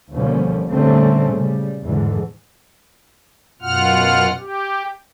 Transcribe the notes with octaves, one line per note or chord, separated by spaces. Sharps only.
D#2 B2 D3 F3 G3 C#4
A#2 D3 G3 A3 C4 C#4
C#3 G3
E2 G#2 B2 D3 E3
F#2 B2 F4 F#5 F6
G4